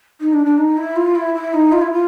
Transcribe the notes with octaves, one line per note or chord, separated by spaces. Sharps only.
D#4
D4
D4
D#4
E4
F4
E4
E4
D#4
F4
E4
F4